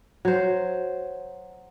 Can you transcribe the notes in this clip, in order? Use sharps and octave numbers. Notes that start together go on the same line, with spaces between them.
F#3 C5